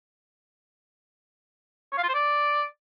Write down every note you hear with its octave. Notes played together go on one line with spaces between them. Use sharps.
C#5
F5
F4
C5
D5